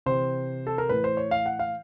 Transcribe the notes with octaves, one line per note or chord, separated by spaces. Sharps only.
C3 E3 C5
A4
A#4
A2 E3 B4
C5
C#5
F5
F#5
F5